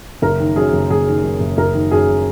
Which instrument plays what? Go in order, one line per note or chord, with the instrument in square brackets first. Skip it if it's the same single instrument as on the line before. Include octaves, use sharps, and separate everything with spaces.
[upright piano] F#1 A#4
D#3
F#2 G#4
F#1
F#1 G#4
D#3
F#2
F#1
F#1 A#4
D#3
F#2 G#4